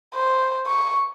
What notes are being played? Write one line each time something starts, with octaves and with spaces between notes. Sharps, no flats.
C5
C#6